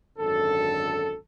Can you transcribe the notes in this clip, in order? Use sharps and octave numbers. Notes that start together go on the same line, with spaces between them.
G#1 F#2 D3 A4